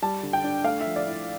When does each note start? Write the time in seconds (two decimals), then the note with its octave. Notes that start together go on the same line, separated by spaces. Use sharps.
0.02 G3 A5
0.23 D3
0.33 G5
0.44 D4
0.64 A3 F5
0.81 E5
0.86 F3
0.96 D5
1.07 E4